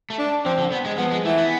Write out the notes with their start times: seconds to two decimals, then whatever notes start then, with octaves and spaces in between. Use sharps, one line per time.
0.10 A3
0.19 D4
0.45 F3 C4
0.59 D3
0.72 B3
0.86 G#3
0.98 F3 B3
1.12 G#3
1.25 E3 A3
1.38 B3